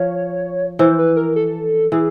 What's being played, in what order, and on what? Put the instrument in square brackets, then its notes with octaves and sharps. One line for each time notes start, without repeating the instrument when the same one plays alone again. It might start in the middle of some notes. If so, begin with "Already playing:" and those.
Already playing: [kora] F3 [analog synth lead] C#5
[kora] E3 [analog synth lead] C5
[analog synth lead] B4
A#4
A4
[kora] E3 [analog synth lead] G#4